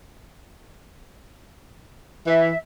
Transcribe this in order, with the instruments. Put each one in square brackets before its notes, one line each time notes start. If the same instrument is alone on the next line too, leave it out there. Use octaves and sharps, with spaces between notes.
[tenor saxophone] E3 [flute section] E5